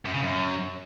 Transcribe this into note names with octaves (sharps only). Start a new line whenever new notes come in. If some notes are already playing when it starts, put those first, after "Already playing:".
F#2
C#3
F#2